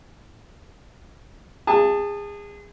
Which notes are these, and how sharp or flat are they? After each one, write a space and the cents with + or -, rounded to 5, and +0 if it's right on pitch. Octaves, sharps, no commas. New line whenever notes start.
G#4 -25 A5 +10